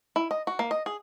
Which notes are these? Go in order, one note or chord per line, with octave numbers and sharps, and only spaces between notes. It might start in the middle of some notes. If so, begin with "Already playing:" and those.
E4
D#5
F#4
A#3
D#5
G#4